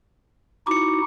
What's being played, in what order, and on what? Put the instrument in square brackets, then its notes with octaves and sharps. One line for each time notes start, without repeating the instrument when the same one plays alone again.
[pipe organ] D#4 E4 F#4 [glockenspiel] D6 C#7